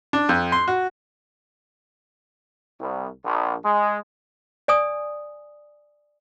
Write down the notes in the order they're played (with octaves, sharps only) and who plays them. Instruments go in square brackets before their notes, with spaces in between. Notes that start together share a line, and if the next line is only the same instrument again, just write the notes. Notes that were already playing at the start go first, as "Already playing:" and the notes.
[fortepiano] D4
F2
C6
F#4
[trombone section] C2
A#1
G#3
[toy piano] D5 G#5 D#6